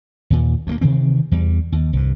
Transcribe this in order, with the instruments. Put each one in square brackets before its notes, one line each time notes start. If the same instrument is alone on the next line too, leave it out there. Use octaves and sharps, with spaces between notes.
[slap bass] D#2 A#2
D2 A3 A#3
C3 D#3 E3 C4
E2 G3
D#2
C2 G2